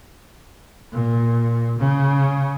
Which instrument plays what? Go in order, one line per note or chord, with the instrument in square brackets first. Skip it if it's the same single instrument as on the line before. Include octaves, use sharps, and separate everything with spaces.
[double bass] A#2
C#3